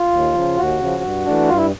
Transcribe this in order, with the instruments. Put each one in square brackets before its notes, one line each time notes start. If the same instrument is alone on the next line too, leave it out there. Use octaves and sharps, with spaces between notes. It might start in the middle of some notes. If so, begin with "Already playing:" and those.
Already playing: [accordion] F4
D#2
C#3 F3
D#2 F#4
C#3 F3
G2
E3 A3 D4
G2 F4
E4